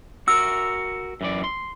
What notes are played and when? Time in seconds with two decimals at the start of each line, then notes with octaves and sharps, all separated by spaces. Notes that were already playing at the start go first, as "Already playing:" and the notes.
0.28 F#4 A#4 E6
1.21 F#2 E3 D5
1.44 C6